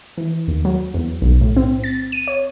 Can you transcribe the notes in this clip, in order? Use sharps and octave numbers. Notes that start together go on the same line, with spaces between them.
E3
D#2
F#3
E2
B1
A2
C4
A6
D#7
C#5